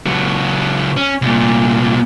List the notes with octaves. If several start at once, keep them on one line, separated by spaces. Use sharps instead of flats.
C#2 F#3
C#4
C2 A#2